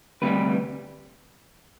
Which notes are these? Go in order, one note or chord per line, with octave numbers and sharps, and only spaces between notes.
D2 C3 G3 B4